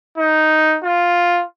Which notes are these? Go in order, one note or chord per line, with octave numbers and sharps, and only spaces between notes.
D#4
F4